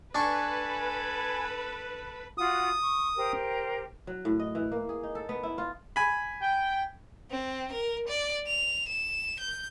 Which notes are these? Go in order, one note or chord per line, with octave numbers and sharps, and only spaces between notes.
D4 A4 B4 G#5 C#6
F4 F#4 F#5 D#6
C#6
G4 A#4 C5
F#3
A2
D#5
E3
A#3
G#4
D#4
A4
B3
E4
F4
G#5 B5
G5
C4
A#4
D5
F7
E7
G6